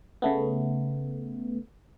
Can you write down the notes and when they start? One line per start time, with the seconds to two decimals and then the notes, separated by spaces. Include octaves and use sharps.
0.22 C#3 A3 B3